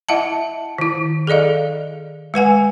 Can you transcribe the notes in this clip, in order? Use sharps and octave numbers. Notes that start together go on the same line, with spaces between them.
E4 D#5 E5 F#5 A5
D#3 E4
G#4 A4 D5 D#5 F5
G#3 B4 F#5 G#5